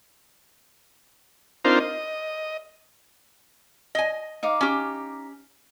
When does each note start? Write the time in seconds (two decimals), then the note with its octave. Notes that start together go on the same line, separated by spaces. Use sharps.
1.65 C4 D4 D#4 F4 A#4 C5
1.80 D#5
3.95 D#5 G#5
4.43 D#4 F5 D6
4.61 C#4 G4